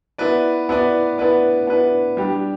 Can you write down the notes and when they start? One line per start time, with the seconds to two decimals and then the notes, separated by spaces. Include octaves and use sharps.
0.18 B3 E4 B4 D5
0.69 B3 E4 B4 D5
1.18 B3 E4 B4 D5
1.67 B3 E4 B4 D5
2.17 G3 D4 G4